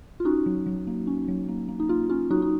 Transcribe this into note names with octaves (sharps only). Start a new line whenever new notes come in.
F4
C#4 D#4 F#4
F#3
F#3
A#3
C#4
F#3
A#3
A#3
D#4
A#3 F4
C#4 F4
F#3 D#4 F#4
D#4